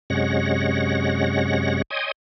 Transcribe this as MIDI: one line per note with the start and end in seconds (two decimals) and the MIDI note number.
0.10 1.82 42
0.10 1.82 48
0.10 1.82 56
0.10 1.82 73
0.10 1.82 78
0.10 1.82 94
1.90 2.11 73
1.90 2.11 75
1.90 2.11 79
1.90 2.11 80
1.90 2.11 84
1.90 2.11 87